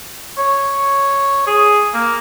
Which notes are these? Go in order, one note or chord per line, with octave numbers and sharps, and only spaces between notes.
C#5
G#4
A#3